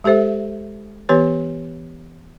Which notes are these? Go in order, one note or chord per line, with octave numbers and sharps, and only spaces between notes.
G#3 G4 A4 C5 E5
E3 B3 G4 B4 C#5